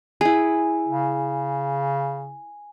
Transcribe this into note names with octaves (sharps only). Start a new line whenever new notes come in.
E4 G#4 G#5
C#3